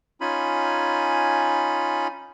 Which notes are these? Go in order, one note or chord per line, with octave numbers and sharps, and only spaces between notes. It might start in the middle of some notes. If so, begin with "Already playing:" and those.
C#4 D#4 F4 G#5 B5